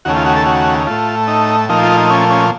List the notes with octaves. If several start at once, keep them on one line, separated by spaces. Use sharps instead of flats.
D#2 C#3 A3 F#4
F4
F#4
A4
F#4
A2 A3 F4
D#4
A#2 F3 A3 D#4
F4
D#4
C#4
C#4